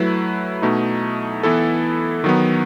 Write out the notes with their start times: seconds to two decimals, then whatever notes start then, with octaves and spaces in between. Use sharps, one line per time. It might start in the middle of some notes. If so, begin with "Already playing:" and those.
Already playing: F#3 A3 E4 B4
0.62 B2 A3 D#4
1.43 E3 B3 E4 A4
2.24 D#3 F#3 B3